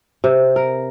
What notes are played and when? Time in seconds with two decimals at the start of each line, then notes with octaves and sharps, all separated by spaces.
0.24 C3
0.56 A#4